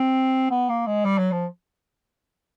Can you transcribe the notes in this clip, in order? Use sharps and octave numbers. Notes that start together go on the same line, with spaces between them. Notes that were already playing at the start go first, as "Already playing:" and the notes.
Already playing: C4
B3
A#3
G#3
G3
F#3
F3